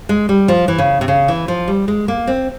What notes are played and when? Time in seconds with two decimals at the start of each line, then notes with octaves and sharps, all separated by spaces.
0.09 G#3
0.29 G3
0.48 F3
0.68 E3
0.78 C#3
1.01 C3
1.08 C#3
1.28 E3
1.48 F3
1.68 G3
1.88 G#3
2.08 A#3
2.27 C4